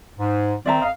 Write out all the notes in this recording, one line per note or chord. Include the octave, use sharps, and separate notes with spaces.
G#2
D#3 C4 D5 E5 A#5
F2 D#5 F5